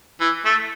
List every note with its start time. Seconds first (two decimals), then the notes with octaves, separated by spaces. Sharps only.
0.21 E3
0.45 A3